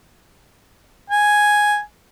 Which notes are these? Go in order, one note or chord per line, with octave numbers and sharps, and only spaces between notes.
G#5